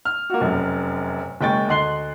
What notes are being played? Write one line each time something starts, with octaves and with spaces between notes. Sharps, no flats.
F6
A#3 F4 F#4
F1 F#2
F#1 G#3 G5 C#6 A6
D2 D#5 C6 F#6 C7 G7